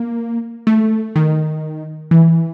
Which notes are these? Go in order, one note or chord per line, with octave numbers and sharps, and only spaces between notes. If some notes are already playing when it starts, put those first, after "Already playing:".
Already playing: A#3
A3
D#3
E3